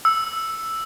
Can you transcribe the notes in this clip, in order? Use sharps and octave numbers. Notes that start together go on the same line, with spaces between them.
E6